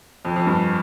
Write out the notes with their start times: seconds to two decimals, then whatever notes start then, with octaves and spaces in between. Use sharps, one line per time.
0.25 F2
0.36 F2
0.47 G2